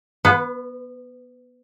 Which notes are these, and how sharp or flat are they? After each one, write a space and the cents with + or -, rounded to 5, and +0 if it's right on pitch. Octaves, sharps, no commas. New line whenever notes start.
B3 -15 B4 +25